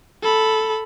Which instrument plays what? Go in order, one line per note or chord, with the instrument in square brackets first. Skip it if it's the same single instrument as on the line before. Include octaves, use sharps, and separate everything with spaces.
[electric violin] A4 B5